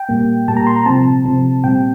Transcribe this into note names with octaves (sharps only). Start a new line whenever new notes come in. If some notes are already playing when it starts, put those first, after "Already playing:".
Already playing: G5
A#2 G3 A#3
A#2 G3 A#3 A5
A#5
C6
A#5
C3 F3 C4 A5
C3 F3 C4
A#2 G3 C4 G5